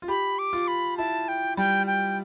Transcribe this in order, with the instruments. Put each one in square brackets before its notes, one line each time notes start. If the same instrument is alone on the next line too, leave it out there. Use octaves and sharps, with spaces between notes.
[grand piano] F4
[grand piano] G4 [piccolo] B5
[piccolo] D6
[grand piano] F4
[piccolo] B5
[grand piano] E4 [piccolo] A5
[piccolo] G5
[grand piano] G3 [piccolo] G5
[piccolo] G5